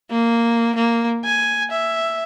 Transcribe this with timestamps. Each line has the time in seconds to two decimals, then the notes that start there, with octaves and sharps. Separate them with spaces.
0.11 A#3
0.76 A#3
1.25 G#5
1.71 E5